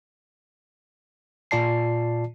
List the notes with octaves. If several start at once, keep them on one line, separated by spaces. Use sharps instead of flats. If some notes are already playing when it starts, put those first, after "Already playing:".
A#2 F4 D5 A5 C7